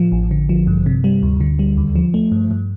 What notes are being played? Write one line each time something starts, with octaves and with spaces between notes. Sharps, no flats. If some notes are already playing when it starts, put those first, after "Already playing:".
Already playing: A2 F3
A1
D3
F3
G2
C3
G3
D2
D3
G3
D#2
F3
A3
G2
G2